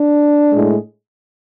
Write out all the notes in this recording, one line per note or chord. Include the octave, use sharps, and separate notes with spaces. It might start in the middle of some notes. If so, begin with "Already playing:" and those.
Already playing: D4
A2 G#3